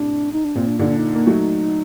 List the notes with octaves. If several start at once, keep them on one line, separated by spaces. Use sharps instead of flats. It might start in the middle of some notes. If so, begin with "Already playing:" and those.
Already playing: A2 C3 D4
D#4
D4
A#2 C4
D4
A#2 D3 D#4
D4
D#4
A#3
F#3 A3